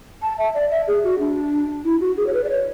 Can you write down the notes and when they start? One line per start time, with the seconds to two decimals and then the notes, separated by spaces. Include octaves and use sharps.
0.22 A5
0.38 E5
0.55 D5
0.70 E5
0.88 G#4
1.04 F#4
1.19 D4
1.85 E4
2.01 F#4
2.17 G#4
2.27 C#5
2.33 B4
2.44 D5
2.50 C#5